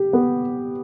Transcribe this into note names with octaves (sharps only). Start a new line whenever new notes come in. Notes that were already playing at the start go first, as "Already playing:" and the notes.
Already playing: G4
B3